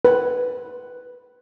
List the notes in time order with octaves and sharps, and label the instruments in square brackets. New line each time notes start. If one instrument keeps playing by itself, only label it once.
[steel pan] B4